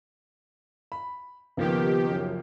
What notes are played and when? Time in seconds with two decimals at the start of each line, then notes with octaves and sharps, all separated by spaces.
0.92 B5
1.57 C#2 D#3 F3 A#3 B3 G4
2.10 F#2